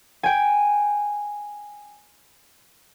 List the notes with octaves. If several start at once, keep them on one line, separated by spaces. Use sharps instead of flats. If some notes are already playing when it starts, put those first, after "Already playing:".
G5 G#5